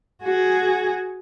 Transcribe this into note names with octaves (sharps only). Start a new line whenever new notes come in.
F#4 G#4